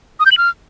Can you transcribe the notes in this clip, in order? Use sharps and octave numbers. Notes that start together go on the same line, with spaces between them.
D#6
G6
F#7
F6